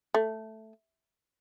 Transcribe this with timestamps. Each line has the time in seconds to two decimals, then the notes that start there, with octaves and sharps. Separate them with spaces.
0.14 A3